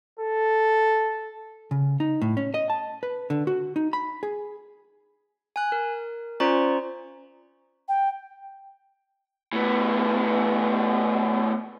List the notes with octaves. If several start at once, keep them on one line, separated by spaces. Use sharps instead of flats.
A4
C#3
D#4
A2
C#4
D#5
A5
B4
D3
F#4
D#4
B5
G#4
G#5 F#6
A#4
C#4 F4 C5 D5 A#5 C#6
G5
A2 B3